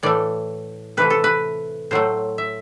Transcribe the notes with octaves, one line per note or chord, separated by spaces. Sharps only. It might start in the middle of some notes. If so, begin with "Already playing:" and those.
A2 E3 A3 D5
C3 E3 A3 B4
A4
B4
A2 F#3 A3 C5
E5